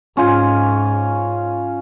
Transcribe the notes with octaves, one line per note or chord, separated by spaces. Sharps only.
G#2 C#4 F4 G#5